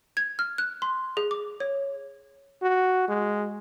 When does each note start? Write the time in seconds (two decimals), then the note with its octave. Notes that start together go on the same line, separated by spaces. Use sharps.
0.17 G#6
0.39 F6
0.58 F#6
0.82 C6
1.17 G#4
1.31 D6
1.60 C#5
2.62 F#4
3.09 G#3